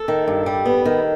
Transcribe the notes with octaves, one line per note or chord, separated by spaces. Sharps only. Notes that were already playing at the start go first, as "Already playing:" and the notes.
Already playing: A4
D#3
G2
G3
B3
D#3